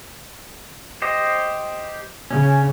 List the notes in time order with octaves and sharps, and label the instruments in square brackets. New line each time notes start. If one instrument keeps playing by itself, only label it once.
[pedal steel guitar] G4 C5 D#5
[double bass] C#3 [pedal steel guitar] C#4